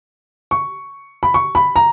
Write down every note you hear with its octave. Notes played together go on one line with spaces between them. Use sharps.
C#6
B5
C#6
B5
A#5